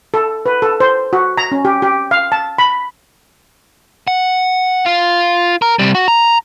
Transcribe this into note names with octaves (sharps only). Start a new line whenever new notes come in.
A4
B4
A4
C5
F#4
A#5
C#4
G4
G4
F5
A5
B5
F#5
F4
A#4
C3 G3
F#4
A#5